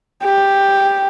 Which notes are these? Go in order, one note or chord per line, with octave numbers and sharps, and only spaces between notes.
G4